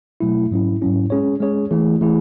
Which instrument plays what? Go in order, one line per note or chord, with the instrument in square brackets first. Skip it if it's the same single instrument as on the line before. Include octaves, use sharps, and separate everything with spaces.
[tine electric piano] B2 F#3 A3 E4
G#2 F#3 C#4 E4
G#2 F#3 C#4 E4
G#3 C#4 G#4 C#5
G#3 C#4 G#4 C#5
E3 A3 E4 G#4
E3 A3 E4 G#4